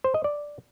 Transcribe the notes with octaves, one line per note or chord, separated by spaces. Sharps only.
C5
D#5
D5